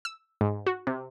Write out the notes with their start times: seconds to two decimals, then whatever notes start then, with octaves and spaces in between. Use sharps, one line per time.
0.05 E6
0.41 G#2
0.67 F#4
0.87 C3